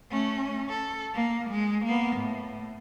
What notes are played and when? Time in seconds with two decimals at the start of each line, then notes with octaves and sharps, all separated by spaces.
0.11 A3 C#4
0.69 A4
1.14 A#3
1.50 G#3
1.86 A#3 B3
2.17 A2